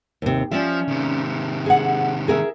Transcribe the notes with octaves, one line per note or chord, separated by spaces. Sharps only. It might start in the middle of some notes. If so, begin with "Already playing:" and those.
D#2 C3
F3 C#4 D5 E5
C3 D#3
G#4 F#5
G#4 A#4 E5